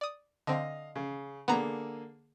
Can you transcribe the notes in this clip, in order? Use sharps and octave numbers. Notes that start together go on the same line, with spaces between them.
D5 D#6
D3 C4 D#5 F5
C#3
D3 A#3 B3 G#4 A#5